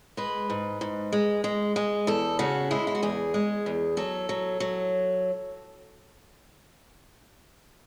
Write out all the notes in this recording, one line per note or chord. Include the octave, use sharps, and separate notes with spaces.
G#3 B4
G#2
G#2
G#3
G#3
G#3
E2 A4
C#3 F#4
G#3 E4
E4
F#4
E2 G#4
G#3
E2
F#3 A4
F#3
F#3